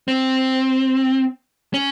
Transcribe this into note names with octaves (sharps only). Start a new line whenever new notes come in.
C4
C#4